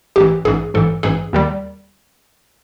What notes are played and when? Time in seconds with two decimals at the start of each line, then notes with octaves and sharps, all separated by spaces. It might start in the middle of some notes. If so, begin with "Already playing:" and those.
0.16 A1 G#2 E3 G4
0.45 A1 G#2 E3 G#4
0.74 A1 G#2 E3 A4
1.03 A1 G#2 E3 G#4
1.33 D#2 D#3 G3